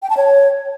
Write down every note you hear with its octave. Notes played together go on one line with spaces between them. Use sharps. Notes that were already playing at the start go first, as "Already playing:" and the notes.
G5
A5
C#5